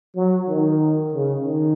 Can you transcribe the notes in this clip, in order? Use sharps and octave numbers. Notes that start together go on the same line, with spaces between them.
F#3
D#3
C#3
D#3